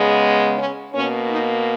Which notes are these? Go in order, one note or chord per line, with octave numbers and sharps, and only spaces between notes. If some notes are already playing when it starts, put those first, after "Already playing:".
Already playing: C#3 G#3 B3
C#4
B2 A#3 C#4
D#4